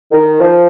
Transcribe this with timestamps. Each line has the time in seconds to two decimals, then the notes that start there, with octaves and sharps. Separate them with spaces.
0.12 D#3
0.40 F3